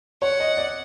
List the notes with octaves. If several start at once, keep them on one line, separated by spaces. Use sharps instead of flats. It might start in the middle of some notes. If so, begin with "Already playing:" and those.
C#5 F#5
D#5
D5